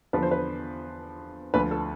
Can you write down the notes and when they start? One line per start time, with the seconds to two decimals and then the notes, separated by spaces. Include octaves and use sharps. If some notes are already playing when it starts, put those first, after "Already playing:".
0.13 E2 D3 F3 B4
0.23 C5
0.31 B4
1.54 D2 D3 F3 B4
1.71 A4